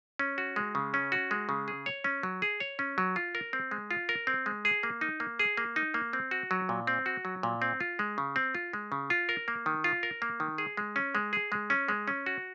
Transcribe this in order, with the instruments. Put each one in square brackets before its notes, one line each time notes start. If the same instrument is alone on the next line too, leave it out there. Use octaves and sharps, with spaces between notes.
[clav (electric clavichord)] C#4
F#4
G#3
C#3
C#4
F#4
G#3
C#3
G#4
C#5
C#4
F#3
G#4
C#5
C#4
F#3
F4
A#4
C4
G#3
F4
A#4
C4
G#3
G#4
A#3
D#4
A#3
G#4
A#3
D#4
A#3
C4
F#4
F#3
A#2
C4
F#4
F#3
A#2
C4
F4
G#3
C#3
C4
F4
G#3
C#3
F4
A#4
A#3
D#3
F4
A#4
A#3
D#3
G#4
G#3
C#4
G#3
G#4
G#3
C#4
G#3
C#4
F#4